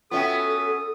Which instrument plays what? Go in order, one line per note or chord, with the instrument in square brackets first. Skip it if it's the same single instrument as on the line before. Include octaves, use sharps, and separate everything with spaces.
[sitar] B3 C#4 F#4 [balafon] F4 E5 G5 [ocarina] A4 [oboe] D#6